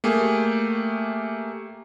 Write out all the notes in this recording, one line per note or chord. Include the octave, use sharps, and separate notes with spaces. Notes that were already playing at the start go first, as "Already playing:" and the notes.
A3 A#3 G4 G#4